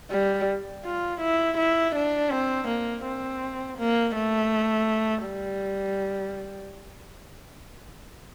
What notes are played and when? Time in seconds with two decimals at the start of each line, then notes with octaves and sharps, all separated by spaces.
0.11 G3
0.85 F4
1.21 E4
1.58 E4
1.95 D4
2.31 C4
2.68 A#3
3.04 C4
3.78 A#3
4.15 A3
5.25 G3